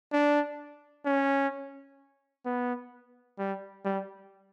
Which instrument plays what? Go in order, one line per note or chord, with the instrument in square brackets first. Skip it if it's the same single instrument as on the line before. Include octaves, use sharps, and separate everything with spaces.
[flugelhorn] D4
C#4
B3
G3
G3